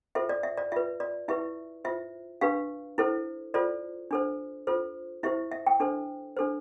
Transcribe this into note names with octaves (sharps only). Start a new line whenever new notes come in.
F4 A4 C5 E5
D5
E5
D5
F4 B4 E5
D5
E4 G4 B4 E5
F4 C5 E5
D4 G4 B4 F5
E4 A4 C5
F4 A4 C5 D5
D4 A4 C5
F4 A4 C5
E4 G4 C5 E5
E5
G5
D4 A4 C5
D4 A4 C5